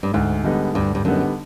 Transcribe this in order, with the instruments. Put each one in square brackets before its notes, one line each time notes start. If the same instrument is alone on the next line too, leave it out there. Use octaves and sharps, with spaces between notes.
[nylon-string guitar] G2
[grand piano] D2 [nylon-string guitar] G#2
[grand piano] D3 G3 B3 D#4
[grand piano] D2 [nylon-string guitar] G2
[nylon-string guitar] G2
[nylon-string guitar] F#2 [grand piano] D3 G3 B3 D#4